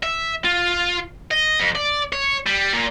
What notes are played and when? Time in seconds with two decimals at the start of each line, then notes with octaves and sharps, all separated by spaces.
0.03 E5
0.44 F4
1.31 D#5
1.60 F2
1.75 D5
2.13 C#5
2.46 G3
2.73 A#2